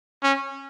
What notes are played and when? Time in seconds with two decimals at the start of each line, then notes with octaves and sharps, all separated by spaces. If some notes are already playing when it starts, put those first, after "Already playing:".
0.23 C#4